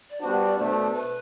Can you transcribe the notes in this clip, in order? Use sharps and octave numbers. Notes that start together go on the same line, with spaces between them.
D5
G3 B3 D4 F#4 C5
D5
B2 A3 D4 C5
B4